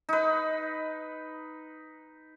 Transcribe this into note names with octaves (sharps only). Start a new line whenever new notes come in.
D#4 B4